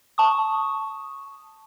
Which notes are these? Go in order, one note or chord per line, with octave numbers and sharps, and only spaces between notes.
A5 C#6 D#6